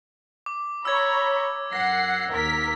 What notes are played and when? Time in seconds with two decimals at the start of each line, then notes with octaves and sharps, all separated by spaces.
0.46 D6
0.85 C#5 A#5 B5 E6 G#6
1.73 F#2 F#5 A#6 C7
2.30 D#2 A#4 B6